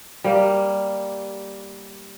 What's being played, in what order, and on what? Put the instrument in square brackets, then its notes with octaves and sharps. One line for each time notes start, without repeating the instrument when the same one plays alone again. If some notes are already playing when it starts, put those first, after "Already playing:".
[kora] G3 A#3